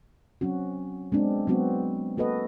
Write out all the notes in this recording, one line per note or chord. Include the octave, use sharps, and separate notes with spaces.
F#3 C4 C#4 F#4
G#3 B3 C4 D4
F#3 G#3 B3 C4 F#4
A#3 F#4 A4 B4 D#5